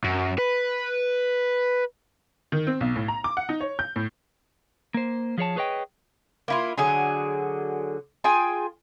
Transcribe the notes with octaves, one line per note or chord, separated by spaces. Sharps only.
F#2
B4
D#3
C4
B1
A2
A#5
D6
F#5
D#4
C#5
G6
A2
A#3 C5
F3 G#4 C#5 A5
G#4 B4 C#5 D#5 G5
A#3 E4 F4
D3 F#3 G#4 G#5
F4 G#4 G5 G#5